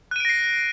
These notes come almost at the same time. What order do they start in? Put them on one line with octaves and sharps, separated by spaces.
F#6 D#7 D7 A#6 C7